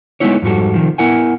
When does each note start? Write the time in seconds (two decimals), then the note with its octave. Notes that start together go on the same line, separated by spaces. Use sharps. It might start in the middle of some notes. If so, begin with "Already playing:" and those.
0.20 G#3 A3 B3 D#4 E4 C#5
0.42 F2 G#2 G3 F#4 A4
0.74 C3 D#3 F3
0.98 B3 E4 A#4 F#5 G#5